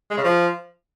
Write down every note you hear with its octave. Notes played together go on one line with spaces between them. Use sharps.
G#3
C#3
F3